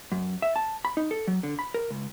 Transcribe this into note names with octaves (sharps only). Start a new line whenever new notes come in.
F#2
E5
A5
B5
D#4
A4
F#3
D3
B5
A#4
C#2